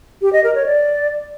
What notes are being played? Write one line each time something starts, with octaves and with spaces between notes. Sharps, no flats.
G4
D#5
A#4
C#5
D5